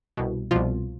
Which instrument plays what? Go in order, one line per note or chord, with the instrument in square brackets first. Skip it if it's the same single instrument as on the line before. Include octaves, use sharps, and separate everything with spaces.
[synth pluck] C2 B2
C2 B2 F3 F4